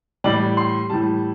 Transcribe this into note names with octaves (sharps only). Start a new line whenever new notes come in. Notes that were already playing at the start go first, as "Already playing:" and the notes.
A2 E3 G3 D5
C6
A2 E3 G3 A5